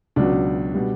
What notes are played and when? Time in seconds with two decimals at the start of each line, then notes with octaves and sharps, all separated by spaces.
0.16 C#2 B2 F#3 D4
0.74 B2 G3